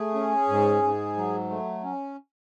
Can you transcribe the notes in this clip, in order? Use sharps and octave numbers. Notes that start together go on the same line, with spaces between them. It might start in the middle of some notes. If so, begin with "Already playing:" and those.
Already playing: A3 G#4
C#4
G#2
G#2
F#3
A3
C#4